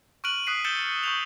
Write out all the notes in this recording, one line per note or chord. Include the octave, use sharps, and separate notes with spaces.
C#6 F6 F#6 D7 D#7 F#7
D#6 F#6 B6 C7 D#7
E6 G6 A6 C#7 E7 G7
C#6 G6 F7